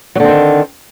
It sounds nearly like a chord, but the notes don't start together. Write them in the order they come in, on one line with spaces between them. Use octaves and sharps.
F#3 D3 C4 D#3